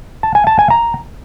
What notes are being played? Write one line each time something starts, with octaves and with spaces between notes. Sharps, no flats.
A5
G#5
A5
G#5
A#5